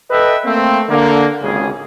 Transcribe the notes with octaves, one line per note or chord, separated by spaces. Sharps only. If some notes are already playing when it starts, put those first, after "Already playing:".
A4 B4 D#5 E5 G5
A3 A#3 C4
D3 A#3
G#1 C#2 C#3 G#4